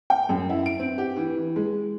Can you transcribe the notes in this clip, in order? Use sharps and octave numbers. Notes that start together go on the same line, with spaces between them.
G5
F#2
E4
D7
C4
G4
E3
E3
G#3